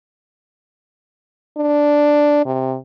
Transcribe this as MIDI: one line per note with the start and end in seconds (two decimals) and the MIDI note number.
1.57 2.44 62
2.46 2.76 48